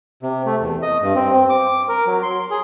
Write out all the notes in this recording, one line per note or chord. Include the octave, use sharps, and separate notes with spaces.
C3
A3
E2
D#5
G2
C4
C4
D6
A#4
F#3
C6
G#4